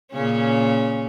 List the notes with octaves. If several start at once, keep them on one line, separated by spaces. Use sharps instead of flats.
A#2 C#3 C#4